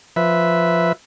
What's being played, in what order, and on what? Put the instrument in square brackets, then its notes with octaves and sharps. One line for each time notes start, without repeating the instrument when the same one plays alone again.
[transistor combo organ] F3 B4 E5